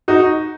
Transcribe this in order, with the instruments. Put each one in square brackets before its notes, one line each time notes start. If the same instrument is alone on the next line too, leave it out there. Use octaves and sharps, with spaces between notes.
[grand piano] D#4 F#4